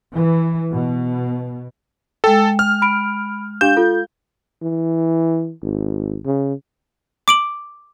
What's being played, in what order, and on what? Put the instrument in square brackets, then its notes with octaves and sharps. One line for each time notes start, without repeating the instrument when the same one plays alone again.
[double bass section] E3
B2
[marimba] G#3 G5 [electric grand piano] A4
[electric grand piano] F6
[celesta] B5 D7
[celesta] D4 G4 E7 [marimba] F5 [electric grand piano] G6
[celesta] F4 A4
[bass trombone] E3
G#1
C#3
[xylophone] D6 D7 F#7